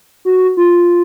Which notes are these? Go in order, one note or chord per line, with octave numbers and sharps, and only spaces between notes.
F#4
F4